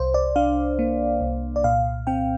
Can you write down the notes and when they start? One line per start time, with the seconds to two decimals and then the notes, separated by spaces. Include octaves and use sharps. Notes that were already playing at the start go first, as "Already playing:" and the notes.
Already playing: C2 C5
0.14 D5
0.36 D4 F5
0.79 A#3
1.21 C2
1.56 D5
1.64 A#2 F5
2.07 C4 G5